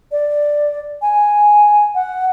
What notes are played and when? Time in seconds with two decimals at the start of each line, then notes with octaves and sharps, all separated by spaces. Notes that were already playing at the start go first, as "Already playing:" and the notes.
0.12 D5
1.02 G#5
1.95 F#5